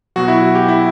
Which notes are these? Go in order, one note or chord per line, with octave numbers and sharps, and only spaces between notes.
B2 F#3 F#4
E4
F#4
G4
E4